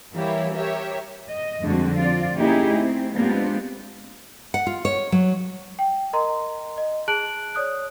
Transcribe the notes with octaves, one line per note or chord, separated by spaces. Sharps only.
E3 G3 A#3 E4 G4 C#5
G4 A#4 C#5 E5
D#5
F2 D3 G3 G#3 C4 F#4
C4 F4 D5
A#3 C#4 D#4 E4 G4 G#4
A3 C4
G#3 B3 C4 D4 F4 G4
F#5
F4
C#5
F#3
G5
A#4 D#5 A#5 C6
D#5
G#4 A5 F#6 D7 F#7
C#5 D5 D#6 F#6